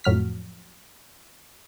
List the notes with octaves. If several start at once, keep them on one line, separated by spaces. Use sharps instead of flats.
F2 A2 F#3 F6 B6